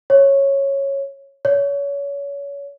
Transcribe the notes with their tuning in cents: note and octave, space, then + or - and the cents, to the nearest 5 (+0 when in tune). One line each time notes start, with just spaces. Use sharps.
C#5 -10
C#5 +30